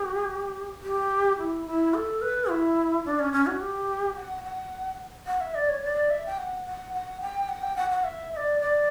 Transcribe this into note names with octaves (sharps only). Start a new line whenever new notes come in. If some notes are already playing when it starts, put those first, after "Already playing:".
Already playing: G4
G4
E4
E4
A4
B4
E4
D4
C#4
C#4
F#4
G4
F#5
F#5
F#5
E5
D5
C#5
D5
E5
G5
F#5
F#5
F#5
G5
F#5
G5
F#5
F#5
E5
E5
D5
D5